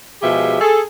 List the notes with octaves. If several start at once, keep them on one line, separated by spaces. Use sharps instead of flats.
B2 F3 G#3 G4 G#4 E5
G#4 A4